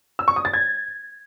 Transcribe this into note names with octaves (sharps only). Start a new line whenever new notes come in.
E6
C#6
D#6
A6
G#6